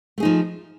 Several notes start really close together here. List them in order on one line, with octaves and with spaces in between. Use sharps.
A3 G#4 D#4 F3